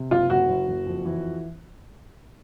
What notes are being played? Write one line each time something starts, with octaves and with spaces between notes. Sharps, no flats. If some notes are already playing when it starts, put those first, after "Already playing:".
Already playing: C3
F#1 F4
F#1 F#4
F#1
F#1
F2
E3